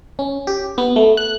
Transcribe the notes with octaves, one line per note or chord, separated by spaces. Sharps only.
C#4
G4
B3
A3
F#6